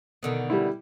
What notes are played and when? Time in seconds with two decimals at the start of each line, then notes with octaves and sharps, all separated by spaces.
0.23 B2 D3 D#3
0.50 G3 E4